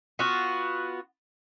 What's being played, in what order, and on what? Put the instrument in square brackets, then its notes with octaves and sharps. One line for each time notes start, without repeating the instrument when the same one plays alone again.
[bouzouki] B3 F4 F#4